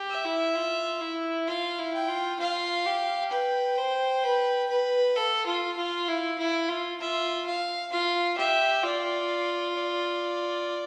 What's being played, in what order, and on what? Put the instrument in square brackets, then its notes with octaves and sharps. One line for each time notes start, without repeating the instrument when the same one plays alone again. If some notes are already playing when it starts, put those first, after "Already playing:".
Already playing: [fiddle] G4
[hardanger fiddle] E5
[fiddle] E4
F4
E4
[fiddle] F4 [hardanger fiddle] F5
[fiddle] E4
[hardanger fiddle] G5
[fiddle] F4
[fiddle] F4 [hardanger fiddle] F5
[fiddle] G4
[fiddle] B4 [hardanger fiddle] G5
[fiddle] C5
B4
B4
[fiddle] A4 [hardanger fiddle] F5
[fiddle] F4
F4
E4
E4
F4
[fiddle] F4 [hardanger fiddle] E5
[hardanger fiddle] F5
[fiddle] F4 [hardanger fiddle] F5
[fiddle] G4 [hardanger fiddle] E5
[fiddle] F4 [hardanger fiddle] D5
[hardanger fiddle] D5